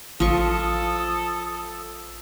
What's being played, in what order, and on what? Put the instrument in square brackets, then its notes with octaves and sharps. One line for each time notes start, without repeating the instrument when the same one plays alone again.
[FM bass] A1 [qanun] F3 C#6 [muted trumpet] A4 [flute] D#6